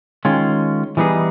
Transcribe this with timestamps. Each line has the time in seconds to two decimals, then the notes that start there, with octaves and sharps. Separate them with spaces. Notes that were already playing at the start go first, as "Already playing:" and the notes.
0.25 D#3 G#3 C#4 F4
0.97 E3 G3 B3 D#4 G#4